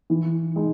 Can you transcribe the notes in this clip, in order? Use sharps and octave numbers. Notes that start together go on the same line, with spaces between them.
E3
G#3 D#4